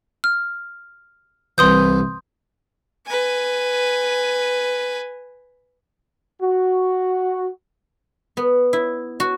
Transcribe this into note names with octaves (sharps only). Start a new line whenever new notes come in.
F6
C2 E3 C6 D#6 G6
B4 G#5
F#4
B3
E4
F#4